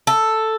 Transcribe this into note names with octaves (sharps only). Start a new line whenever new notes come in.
A4